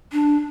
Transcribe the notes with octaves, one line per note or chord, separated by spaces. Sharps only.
D4